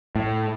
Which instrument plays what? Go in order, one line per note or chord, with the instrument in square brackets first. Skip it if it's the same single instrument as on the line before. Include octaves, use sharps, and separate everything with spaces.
[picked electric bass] A2